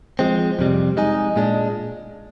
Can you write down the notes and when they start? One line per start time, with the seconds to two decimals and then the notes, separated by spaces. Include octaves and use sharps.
0.19 F3 G#3 C4
0.59 F2 C3 G3
0.97 G#3 D#4 G#4
1.36 A#2 G#3 D4